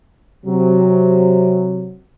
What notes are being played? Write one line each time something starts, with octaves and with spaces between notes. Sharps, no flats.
C3 F#3